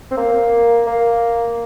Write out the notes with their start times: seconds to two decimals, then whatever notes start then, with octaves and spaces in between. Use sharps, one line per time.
0.11 C4
0.17 A#3
0.87 A#3